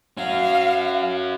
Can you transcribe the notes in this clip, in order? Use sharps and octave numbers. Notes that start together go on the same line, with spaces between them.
C#4 F#4 F5